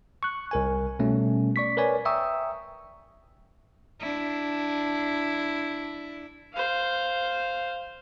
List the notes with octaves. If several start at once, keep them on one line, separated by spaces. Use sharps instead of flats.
C#6 F#6
C2 A#4 G#5
B2 G3 A3 C#4
D5 C#6 B6
A#4 B4 C#5 D5 G#5
E5 G5 A#5 C#6 D#6 E6
D4 E4
C5 F5